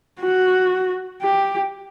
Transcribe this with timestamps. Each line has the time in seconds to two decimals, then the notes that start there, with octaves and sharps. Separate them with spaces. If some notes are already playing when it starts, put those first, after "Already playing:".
0.21 F#4
1.22 G4